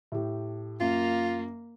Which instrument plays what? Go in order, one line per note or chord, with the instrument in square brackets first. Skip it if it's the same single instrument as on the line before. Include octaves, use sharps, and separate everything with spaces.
[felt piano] A2 G4
[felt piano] F#2 [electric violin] A#3 [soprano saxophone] F4